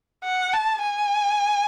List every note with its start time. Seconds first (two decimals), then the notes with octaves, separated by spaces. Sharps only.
0.24 F#5
0.53 A5
0.82 G#5